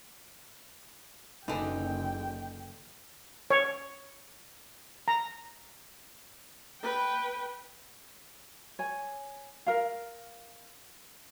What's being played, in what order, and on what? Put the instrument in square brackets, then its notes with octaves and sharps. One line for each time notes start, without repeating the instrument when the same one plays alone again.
[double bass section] F#1 [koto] D3 E3 [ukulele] D#4 [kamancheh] G5
[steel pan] C#5
A#5
[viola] B4 G5
[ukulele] C#5 G#5
A#4 F5